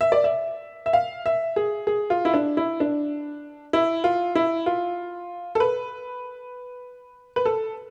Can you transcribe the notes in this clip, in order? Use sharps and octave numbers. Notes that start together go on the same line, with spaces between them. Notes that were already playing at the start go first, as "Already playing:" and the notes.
E5
D5
E5
E5
F5
E5
G#4
G#4
F4
E4
D4
E4
D4
E4
F4
E4
F4
A4
B4
B4
A4